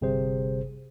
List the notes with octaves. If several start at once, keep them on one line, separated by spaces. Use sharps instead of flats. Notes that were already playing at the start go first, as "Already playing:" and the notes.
G1 C3 G3 G#4 C5